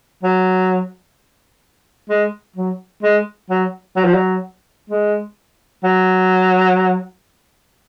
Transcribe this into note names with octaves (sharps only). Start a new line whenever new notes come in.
F#3
G#3
F#3
G#3
F#3
F#3
F3
F#3
G#3
F#3